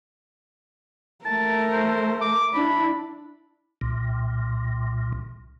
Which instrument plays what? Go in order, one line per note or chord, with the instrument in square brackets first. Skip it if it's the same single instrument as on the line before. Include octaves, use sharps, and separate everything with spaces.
[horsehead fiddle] A3 A#4 [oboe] A5
[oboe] C5
D6
[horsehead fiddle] D4 E4 [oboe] B5
[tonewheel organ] C2 A#2